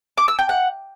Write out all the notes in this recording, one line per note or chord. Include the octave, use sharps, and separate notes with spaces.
D6
E6
G5
F#5